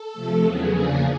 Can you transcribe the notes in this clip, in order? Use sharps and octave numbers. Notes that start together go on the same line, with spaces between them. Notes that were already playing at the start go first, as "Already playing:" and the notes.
Already playing: A4
C3 F3 A3
E2 C#3 F#3 B3 G#4
E2 C#3 F3 A#3 D4 G#4